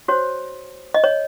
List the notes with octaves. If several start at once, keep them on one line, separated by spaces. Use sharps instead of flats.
F#4 C5 C#5
D#5
C#5